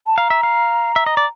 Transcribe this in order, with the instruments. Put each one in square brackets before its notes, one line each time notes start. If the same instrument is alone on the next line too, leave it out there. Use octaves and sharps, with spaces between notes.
[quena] A5
[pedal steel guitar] F5 [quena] A#5
[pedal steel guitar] E5
F5
E5
D#5
D5